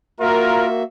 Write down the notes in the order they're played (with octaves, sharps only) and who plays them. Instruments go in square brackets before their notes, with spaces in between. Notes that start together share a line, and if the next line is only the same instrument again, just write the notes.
[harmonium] A#3 F#4 E5 [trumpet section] F4 A#4